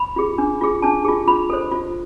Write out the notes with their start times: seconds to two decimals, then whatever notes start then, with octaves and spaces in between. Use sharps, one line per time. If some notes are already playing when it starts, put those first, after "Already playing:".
Already playing: B5
0.16 F4 G#4
0.38 D4
0.61 F4 G#4
0.82 D4 A5
1.04 F4 G#4
1.28 F4 B5
1.50 A4 C5
1.71 F4